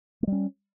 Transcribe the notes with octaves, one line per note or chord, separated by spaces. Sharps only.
G3 A3 C#4